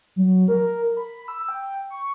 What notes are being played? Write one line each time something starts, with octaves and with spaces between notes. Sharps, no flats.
F#3
A#4
B5
E6
G5
C#6